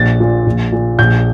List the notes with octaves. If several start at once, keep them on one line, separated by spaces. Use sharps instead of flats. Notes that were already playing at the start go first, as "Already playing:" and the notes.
Already playing: A#1 A6
A#2
A#1
A#2
A#1 G6